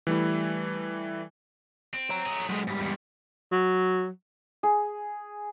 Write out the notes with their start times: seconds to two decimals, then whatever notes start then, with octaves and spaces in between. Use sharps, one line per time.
0.07 E3 G3 A3 E4
1.94 C4
2.10 C#5 A#5
2.26 A3 G#4
2.50 F#3 G#3
2.67 G#2 G3
2.81 E2
3.52 F#3
4.63 G#4